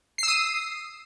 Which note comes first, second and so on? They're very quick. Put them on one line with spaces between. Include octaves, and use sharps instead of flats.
C7 E6 D#6